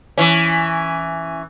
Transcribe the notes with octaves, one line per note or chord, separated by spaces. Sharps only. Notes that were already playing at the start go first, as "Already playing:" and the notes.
E3 C#4